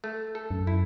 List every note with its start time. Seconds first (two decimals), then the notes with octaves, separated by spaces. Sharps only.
0.04 A3
0.35 A4
0.51 F#2
0.67 E4